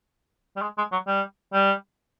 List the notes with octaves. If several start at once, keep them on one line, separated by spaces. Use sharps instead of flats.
G3
G#3
G#3
F#3
G3
G3